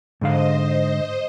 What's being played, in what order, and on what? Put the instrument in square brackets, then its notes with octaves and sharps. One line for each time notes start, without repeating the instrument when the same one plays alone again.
[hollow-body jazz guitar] G#2 D3 F5 [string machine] C5 D#5